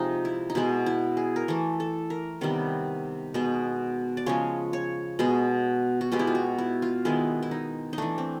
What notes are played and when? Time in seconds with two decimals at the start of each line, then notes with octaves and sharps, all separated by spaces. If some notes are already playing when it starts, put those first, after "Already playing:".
Already playing: C3 F3 G#3 D#4
0.25 E4
0.50 D#4
0.55 B2 G#3 B3 E4
0.86 E4
1.17 G#4
1.36 A#4
1.48 E3 A3 A4
1.80 A4
2.10 A#4
2.41 C3 D#3 G3 B3
3.34 B2 G#3 B3
4.17 D5
4.26 C#3 F3 G#3 C#5
4.73 C#5
5.19 B2 G#3 B3
6.01 F#4
6.12 B2 G#3 B3 G4
6.19 E4
6.27 F4
6.35 F#4
6.58 E4
6.82 F4
7.05 D#3 G#3 B3 E4
7.43 E4
7.51 D#4
7.93 D#4
7.98 E3 A3 D4
8.18 C4